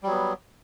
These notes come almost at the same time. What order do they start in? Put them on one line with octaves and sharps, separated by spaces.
G3 F#3 B3